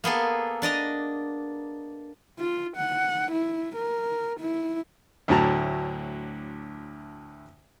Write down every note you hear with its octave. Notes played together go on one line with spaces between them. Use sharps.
A#3 B3 G#4 A4
D4 D5 D#5 A#5
F4
F#5
E4
A#4
E4
D2 A2 D3 F#3 A5 A#5